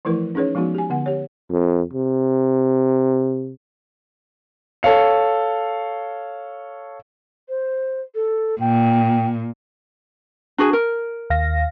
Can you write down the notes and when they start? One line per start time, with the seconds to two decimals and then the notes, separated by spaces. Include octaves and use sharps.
0.05 E3 F3 A3 E4 A#4 B4
0.35 C#4 D#4 G#4 B4 C#5
0.55 F3 G#3 B3 D#4 F#4
0.75 G4 G#5
0.90 D3 B3 F#5
1.06 G4 C#5
1.50 F2
1.93 C3
4.83 A4 C#5 F5 C#7
7.49 C5
8.15 A4
8.61 A#2 G5
10.58 D4 F#4 G#4
10.73 A#4
11.30 D#2 F5 A#6